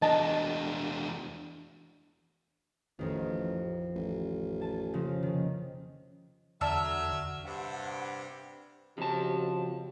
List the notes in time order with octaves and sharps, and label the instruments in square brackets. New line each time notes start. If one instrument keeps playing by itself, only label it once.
[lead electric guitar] E2 D4 [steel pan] D#5 [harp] A5
[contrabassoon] A1 [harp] F2 D#3
[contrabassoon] A1
[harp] G#5 A5
C#3 F3 A#3
C3 D#3
[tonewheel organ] E2 D3 F6 [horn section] F#3 E5 [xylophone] D5 A5 E6
[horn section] G2 C3 [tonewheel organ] F#5
[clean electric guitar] F2 A5 [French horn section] C#3 F#4 G4